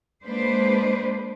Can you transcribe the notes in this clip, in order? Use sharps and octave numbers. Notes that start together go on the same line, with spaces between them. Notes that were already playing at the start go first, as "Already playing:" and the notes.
G#3 A#3 D4 B4 C5